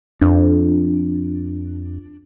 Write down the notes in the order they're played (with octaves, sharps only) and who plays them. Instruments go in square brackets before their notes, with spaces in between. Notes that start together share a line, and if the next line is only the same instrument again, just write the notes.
[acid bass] F2 [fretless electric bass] D4